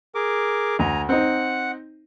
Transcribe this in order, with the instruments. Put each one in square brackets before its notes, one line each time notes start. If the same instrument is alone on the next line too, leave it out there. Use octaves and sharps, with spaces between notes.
[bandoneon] G#4 A#4 D6
[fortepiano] D2 [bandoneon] G#5 A#5
[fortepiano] C4 D#4 [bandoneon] F#5 F#6